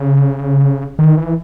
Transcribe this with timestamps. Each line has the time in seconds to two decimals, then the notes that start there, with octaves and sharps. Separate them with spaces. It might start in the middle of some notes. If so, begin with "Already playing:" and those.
Already playing: C#3
0.99 D#3
1.17 E3